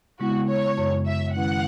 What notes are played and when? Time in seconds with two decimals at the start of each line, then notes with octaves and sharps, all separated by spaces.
0.20 C#3 G#3 B3 E4 F#4
0.48 C#5
0.78 F#2 C#3 G#3
1.06 E5
1.35 D#3 G#3 C#4 E4 B4 F#5